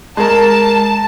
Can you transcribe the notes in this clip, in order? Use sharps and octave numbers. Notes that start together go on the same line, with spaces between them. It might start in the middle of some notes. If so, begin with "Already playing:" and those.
G#3 A#4 A5